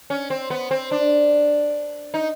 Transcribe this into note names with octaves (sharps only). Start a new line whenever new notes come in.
C#4
C4
B3
C4
D4
D#4